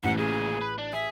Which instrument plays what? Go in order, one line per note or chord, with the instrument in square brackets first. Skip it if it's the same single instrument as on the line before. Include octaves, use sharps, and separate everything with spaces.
[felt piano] A1 [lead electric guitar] F2 G#2 [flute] F#5
[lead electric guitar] A#2 C#3 [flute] G#4
[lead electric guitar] B4
D4
[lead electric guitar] G#4 [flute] E5